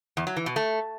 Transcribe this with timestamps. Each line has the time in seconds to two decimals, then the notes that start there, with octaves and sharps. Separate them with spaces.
0.17 E2
0.27 F#3
0.36 E3
0.46 B2
0.56 A3